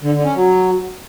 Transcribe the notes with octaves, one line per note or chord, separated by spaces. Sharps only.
D3
D3
C#4
F#3